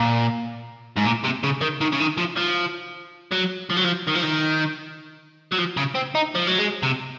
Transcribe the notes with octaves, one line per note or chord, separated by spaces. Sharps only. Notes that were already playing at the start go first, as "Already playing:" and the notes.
Already playing: A#2
G#2
A#2
C3
C#3
D#3
D#3
C#3
D#3
F3
F3
F#3
F3
F#3
F3
D#3
F3
D#3
F#3
F3
C#3
C4
D#4
F3
F#3
G#3
C3